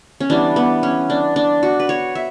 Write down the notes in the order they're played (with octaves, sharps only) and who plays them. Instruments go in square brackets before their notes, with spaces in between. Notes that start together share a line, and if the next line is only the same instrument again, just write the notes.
[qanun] C#4
E3 G3 B3 D4
B3
C#4
D4
D4
F#4
B4
C#5
E5